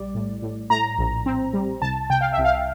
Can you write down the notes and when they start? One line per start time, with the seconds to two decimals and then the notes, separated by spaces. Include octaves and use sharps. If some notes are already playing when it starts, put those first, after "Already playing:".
Already playing: A#1 G3 D5
0.14 A2
0.42 A2
0.70 A2 A#5
0.98 A#1
1.26 C4
1.54 G3
1.82 C2 A5
2.10 C3 G5
2.21 F5
2.33 E5
2.38 C2
2.44 F5